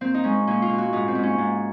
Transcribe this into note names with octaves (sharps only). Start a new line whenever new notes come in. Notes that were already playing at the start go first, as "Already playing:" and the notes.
A#2 C4
D#4
G#3 C#4
A#2 C#4
F4
A#2
F#4
G#2 D#4
C4
G#2
C#4
G#2